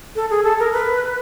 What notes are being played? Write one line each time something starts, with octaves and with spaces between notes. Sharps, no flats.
A4
G#4
A4
A#4
B4